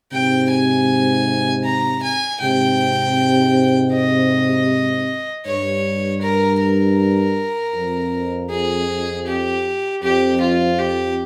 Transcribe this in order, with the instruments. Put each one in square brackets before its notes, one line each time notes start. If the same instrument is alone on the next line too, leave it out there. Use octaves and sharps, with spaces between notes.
[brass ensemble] G#2 C3 [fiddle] G5
[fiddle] G#5
A#5
G#5
[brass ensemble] G#2 C3 [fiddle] G5
[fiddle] D#5
[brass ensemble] G2 [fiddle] C#5
[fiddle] A#4
A#4
[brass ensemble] F2
[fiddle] G#4
G4
[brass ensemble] F2 [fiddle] G4
[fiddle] F4
G4